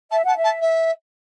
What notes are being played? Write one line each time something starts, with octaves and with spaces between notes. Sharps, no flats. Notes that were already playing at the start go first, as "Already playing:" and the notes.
E5 A5
F#5 A5
E5
A5
E5